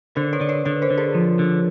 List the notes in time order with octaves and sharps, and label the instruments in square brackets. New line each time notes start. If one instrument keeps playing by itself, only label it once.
[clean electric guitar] D3 [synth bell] A#4 C5
[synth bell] B4 C#5
[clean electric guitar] D3 [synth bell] D5
[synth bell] B4 C#5
[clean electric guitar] D3 [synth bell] B4 C#5
[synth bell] A#4 C5
[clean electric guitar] D3
[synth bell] G#4 A#4
[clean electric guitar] F3
D3